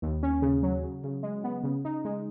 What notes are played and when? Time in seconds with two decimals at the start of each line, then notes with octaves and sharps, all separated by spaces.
0.02 D#2
0.23 C#4
0.42 C#3
0.63 F#3
0.83 C#3
1.04 C#3
1.23 G#3
1.44 B3
1.64 C#3
1.85 D#4
2.05 G#3